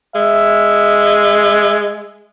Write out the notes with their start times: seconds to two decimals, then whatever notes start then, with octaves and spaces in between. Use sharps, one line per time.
0.15 G#3 E5